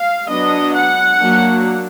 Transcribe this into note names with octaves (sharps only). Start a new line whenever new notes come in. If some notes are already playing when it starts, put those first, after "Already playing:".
Already playing: F5
F#3 B3 D4 D#5
F#5
F#3 A#3 D4